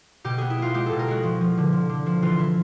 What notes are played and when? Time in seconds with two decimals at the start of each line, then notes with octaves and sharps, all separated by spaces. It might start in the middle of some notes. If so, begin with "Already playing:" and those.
0.24 B2 G4
0.38 B3 G#4
0.50 E4
0.58 B3 F4
0.74 G#3 G4
0.86 A4
0.92 B2
0.99 A#4
1.08 G#3 F#4
1.23 F3
1.41 F3
1.57 D3
1.73 F3
1.89 D3
2.06 F3
2.22 E3 F4
2.39 E4